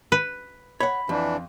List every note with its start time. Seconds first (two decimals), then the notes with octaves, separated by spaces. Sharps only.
0.12 B4
0.80 C#5 F#5 B5
1.09 F2 E3 D4